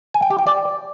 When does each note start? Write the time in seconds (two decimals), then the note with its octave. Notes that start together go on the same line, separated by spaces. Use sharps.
0.14 G#5
0.22 G5
0.30 G4
0.39 G5
0.47 D5